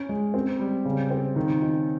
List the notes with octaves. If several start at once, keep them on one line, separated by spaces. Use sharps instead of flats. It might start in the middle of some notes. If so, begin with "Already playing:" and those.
Already playing: C#4
G#3
C4
G3
C#3
C4
D#3
D#4